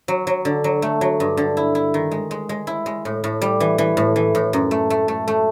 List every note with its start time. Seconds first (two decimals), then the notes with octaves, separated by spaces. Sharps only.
0.08 F#3
0.27 F#3
0.45 D3
0.64 F#3
0.82 A3
1.01 F#3
1.20 G2
1.37 D3
1.57 E4
1.75 E4
1.94 D#3
2.11 G#3
2.31 G#3
2.49 G#3
2.67 E4
2.86 G#3
3.05 A2
3.24 A2
3.42 G3
3.60 E3
3.78 E3
3.97 A2
4.16 E3
4.35 A2
4.53 F#2
4.71 A3
4.90 A3
5.08 A3
5.28 A3